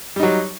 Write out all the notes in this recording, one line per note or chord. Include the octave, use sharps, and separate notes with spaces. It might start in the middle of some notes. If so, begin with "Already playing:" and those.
F#3 G3 D#4